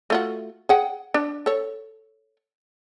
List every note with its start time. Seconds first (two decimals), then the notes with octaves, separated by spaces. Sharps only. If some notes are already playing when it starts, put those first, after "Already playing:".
0.10 A3 F4 F#4
0.69 G#4 F#5 G5
1.14 D4
1.46 A4 C#5